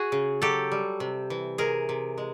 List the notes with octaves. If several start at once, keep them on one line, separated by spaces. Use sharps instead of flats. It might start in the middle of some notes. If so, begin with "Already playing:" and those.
Already playing: F#4 G#4
C#3
F#3 G4 A4
G3
C3
E3
C3 G#4 A#4
C3
G#3